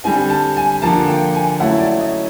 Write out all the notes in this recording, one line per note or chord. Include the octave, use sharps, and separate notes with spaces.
D3 G3 C4 G#5
A5
G#5
D3 F3 A#3 A5
G5
G#5
F#3 A3 C#4 E4 F#5
D5
D#5